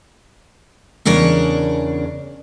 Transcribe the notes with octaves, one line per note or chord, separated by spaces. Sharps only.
E2 C#3 D4 A#4 C#5